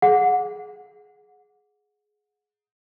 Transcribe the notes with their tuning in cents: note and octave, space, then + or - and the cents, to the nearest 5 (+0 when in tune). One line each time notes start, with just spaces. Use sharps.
G#4 +15 F#5 -20